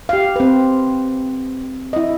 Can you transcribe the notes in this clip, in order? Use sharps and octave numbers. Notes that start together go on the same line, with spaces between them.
G4 F5
C4 B4
E4 D#5